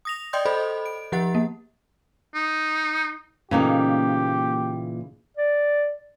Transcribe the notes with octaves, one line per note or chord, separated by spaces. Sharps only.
D#6 A#6 F7
D5 D#5 G5 C6 D#6 G6
A4 C5 D#5 B5
D7
F3 G4 F#5 A6
A#3
D#4
A#2 C#3 E3 A3 A#3 D#4 G4
D5